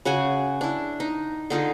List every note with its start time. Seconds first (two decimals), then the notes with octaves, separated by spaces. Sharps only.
0.05 C#3 F#4 F#5 G#5
0.61 D4 E4
1.00 D#4
1.50 D3 D#4 F4 G#4